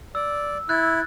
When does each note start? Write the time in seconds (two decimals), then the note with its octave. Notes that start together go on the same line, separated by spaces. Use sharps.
0.15 D5 E6
0.69 E4 F#6 G#6 A6